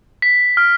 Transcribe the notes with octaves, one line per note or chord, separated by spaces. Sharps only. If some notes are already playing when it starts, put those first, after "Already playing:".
B6
F6